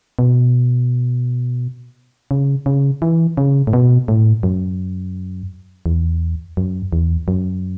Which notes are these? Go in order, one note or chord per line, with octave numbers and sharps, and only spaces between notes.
B2
C#3
C#3
E3
C#3
A2
B2
A2
F#2
E2
F#2
E2
F#2